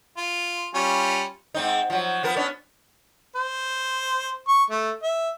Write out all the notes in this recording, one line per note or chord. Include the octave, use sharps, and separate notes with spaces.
F4
G3 C#4 F4
G#2 C4 D#4
F3 F#3
F3 B3 A#4
B3 C#4 D4
C5
C#6
A3
E5